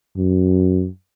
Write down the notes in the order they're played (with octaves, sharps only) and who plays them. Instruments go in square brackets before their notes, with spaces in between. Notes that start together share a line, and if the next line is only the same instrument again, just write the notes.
[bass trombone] F#2